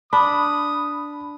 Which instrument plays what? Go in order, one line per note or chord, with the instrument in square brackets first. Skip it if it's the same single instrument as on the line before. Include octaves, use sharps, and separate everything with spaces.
[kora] D4 [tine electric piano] B5 [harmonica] D#6